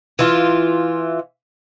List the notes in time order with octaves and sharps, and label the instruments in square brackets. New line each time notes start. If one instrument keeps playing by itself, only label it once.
[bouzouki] E3 F4